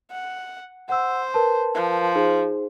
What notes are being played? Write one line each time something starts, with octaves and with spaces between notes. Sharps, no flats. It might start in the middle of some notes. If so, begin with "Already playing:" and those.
F#5
C5 F#5 E6
A#4 B4 A5
F3
D#4 G#4 C5